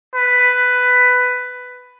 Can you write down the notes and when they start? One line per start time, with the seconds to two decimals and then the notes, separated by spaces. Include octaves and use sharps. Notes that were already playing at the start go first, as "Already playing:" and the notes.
0.15 B4